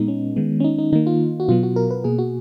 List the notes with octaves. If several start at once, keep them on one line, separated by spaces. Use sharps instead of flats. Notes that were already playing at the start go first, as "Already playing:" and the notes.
Already playing: A#2 G#3 B3 D#4
C#4
D#3 G#3 B3
C#4
D#4
D#4
D#3 A#3 D#4
F4
F#4
B2 F#3 B3 F4
F#4
A#4
B4
B2 A#3 G#4
F#4